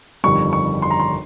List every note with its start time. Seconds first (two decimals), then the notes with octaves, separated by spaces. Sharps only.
0.24 G1 F2 D#3 G3 C#6
0.53 C#6
0.82 C6
0.90 A#5
0.99 C6